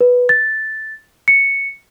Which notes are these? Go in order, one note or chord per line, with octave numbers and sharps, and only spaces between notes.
B4
A6
C#7